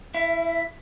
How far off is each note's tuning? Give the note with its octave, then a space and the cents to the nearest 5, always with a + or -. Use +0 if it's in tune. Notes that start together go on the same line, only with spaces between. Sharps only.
E4 +5 E5 +35